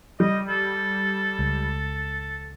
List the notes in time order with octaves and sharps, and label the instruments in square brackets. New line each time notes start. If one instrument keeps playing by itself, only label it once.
[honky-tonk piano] G3 [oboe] D#5
[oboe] A4
[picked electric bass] C#2